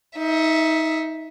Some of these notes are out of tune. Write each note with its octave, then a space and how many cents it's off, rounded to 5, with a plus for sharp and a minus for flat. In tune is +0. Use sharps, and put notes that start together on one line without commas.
D#4 +25 E5 +0